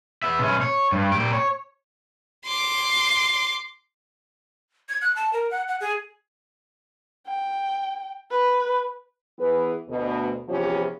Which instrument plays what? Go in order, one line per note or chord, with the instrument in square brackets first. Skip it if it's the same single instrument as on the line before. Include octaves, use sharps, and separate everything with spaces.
[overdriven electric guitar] B3 E5
B2 C#4
C#5
G2
A#2 G4
C#5
[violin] C6 D6
[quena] G#6
F#6
A5
A#4
F#5
F#5
G#4
[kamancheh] G5
B4
[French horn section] E3 B3 G#4 B4
D2 B2
E2 C3 E3 F3 C#4